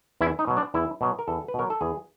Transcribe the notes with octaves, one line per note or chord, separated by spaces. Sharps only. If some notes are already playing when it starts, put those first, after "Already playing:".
E2 E4
D#4
B2 F#3
D4
E2 E4
B2 F#3
A#4
E2 A4
B4
B2 F#3 A#4
A4
E2 G#4